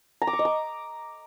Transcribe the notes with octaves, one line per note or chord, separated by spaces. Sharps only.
A#5
D6
C#6
D#5
D6